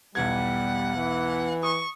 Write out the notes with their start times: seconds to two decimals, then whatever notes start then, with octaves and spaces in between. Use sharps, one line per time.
0.15 B1 E2 G3 F#5 G#6
0.95 E3
1.63 C#6 D#6